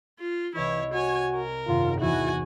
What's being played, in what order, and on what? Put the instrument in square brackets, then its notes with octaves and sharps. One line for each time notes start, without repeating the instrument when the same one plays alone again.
[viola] F4
[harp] C2 D#5 [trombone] E3 [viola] E4 C#5
[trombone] F#4 [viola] C#5 G#5
[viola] A#4
[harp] G#1 F#2 C3 [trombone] F4
[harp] E2 E3 [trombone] E4 [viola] F#4 G#5